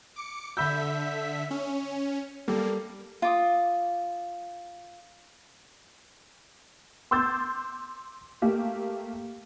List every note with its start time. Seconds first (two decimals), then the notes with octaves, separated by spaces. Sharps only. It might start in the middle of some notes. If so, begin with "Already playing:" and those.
0.16 D6 C#7
0.57 D3 E5 B5 E6 G6 B6
1.51 C#4
2.48 G3 A#3 A4
3.22 F4 D6 D#6
7.11 C6 D6 E6 G6 A6
8.42 A3 A#3 G4